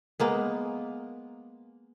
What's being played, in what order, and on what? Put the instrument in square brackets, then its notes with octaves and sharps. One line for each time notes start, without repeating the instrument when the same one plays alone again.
[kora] G#3 A#3 B3